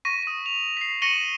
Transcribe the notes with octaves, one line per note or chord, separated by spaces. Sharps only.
C#6 A#6 B6 D#7
D#6 D#7
F7
B6 C7
C#6 A#6 C#7 D#7 F#7 G7